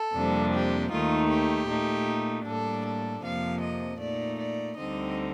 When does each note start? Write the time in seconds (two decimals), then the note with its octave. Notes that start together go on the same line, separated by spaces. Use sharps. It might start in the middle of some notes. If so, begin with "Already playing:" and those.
Already playing: A4
0.15 F2 C3 G3 A#3 D4
0.53 G4
0.92 D#2 D#3 A3 D#4 F4
1.30 G4
1.69 A#2 A3 D#4
2.46 A2 G3 A#3 D4 A4
2.85 A4
3.24 F2 C3 F3 A#3 F5
3.62 D#5
4.01 A#2 A3 D#4 D5
4.39 D5
4.78 D2 D3 G3 C4 D#4 D#5